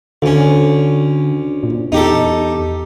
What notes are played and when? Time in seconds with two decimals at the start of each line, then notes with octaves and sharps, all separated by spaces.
0.22 D2 D3 C#4
1.63 A#2
1.92 E2 D#4 G4 A4